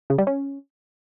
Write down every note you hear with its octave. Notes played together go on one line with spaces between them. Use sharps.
C#3
G3
C#4